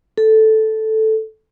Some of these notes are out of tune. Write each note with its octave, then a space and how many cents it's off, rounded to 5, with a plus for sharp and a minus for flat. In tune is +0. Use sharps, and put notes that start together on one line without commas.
A4 -5